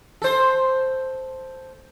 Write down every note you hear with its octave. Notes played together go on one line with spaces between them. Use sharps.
A4 C5